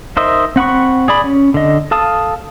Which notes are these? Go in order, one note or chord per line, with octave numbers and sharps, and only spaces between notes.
D#4 A#4 C5 D#5 E5
C4 F#5 B5 C#6
G#4 D5 B5
C#4
D3 D#5
A4 F5 A5 D#6